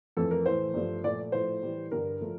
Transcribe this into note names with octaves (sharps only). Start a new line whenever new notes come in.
F2 E3 A3 A4
A#4
A2 E3 A3 C5
G2 F3 A3
A#2 F3 A3 D5
A2 F3 A3 C5
A2 E3 G3
G2 D3 G3 A#4
F3 A3